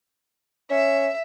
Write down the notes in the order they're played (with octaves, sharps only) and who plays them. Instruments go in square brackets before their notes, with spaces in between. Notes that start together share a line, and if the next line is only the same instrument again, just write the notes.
[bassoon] C#4 [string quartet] E5